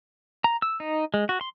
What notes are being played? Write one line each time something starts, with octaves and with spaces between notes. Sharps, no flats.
A#5
E6
D#4
G#3
F#4
C6